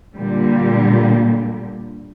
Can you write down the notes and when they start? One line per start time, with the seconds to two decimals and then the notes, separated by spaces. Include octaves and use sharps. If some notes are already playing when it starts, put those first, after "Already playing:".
0.15 A#2 D3 G3